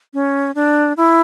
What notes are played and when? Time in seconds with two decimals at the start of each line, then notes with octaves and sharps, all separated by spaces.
0.14 C#4
0.55 D4
0.97 E4